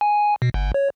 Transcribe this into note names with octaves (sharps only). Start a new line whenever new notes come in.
G#5
B2
G1
C#5